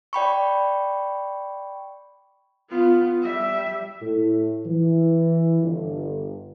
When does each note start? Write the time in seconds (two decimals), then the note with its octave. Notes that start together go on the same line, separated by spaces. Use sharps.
0.13 D5 G5 B5 C#6
2.69 B3 F4
3.23 G3 E5
4.01 A2
4.66 E3
5.63 G1